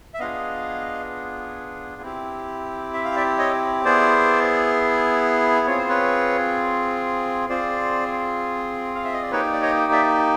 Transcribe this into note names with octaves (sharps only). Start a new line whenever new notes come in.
E5
B3 D4 F4 G#4 D#5 F5
C4 E4 G4
E5
F5
D5 E5
C#5 D#5
B3 E4 G#4 C5 D5
C4 F4 G#4 C#5
C5
B4 C#5
C4 F4 G#4 C5 D5
F5
E5
D#5
D5
A#3 D#4 G4 B4 C#5
D5
C#5 D#5
D5 E5